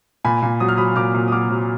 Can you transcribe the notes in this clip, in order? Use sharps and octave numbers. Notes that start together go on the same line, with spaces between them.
A#2 G#5 B5
A#2
F#3 D#6
F6
F#3 B5 D#6
A#2 D6 F6
A#2
D#6
F#3 D6 F6
F#3